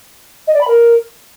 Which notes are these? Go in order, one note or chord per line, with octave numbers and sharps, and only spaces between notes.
D#5
D5
B5
A#4